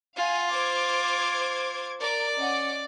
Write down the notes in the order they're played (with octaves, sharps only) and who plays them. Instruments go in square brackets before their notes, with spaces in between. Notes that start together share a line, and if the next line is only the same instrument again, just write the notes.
[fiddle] F4 [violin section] F5 F#5 G#5
[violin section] C5 D6 G#6
[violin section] A#4 [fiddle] D5 D6
[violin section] C#4 D#5 F#5